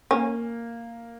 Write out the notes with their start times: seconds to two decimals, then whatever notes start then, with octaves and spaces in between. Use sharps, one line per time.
0.11 A#3 C#4